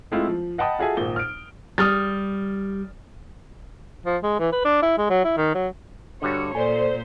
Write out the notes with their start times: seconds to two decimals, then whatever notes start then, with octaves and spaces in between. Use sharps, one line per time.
0.12 G#3 A3 C4 E4 F4
0.28 F3
0.58 D#5 F#5 G5 A5 B5 D#6
0.79 F4 F#4 G#4 A4 E5 G#5
0.97 G#1 A#2 G7
1.16 F6 D7
1.78 G3 D#6 F6 A6
4.06 F3
4.23 G#3
4.39 E3
4.52 B4
4.65 D4
4.82 E4
4.98 G#3
5.10 F#3
5.25 E4
5.37 D#3
5.55 F#3
6.22 G2 D3 F#4 C#5
6.55 A#2 A4 C5 D5 G#5